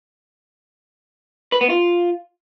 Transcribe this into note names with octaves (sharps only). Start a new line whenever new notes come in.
B4
B3
F4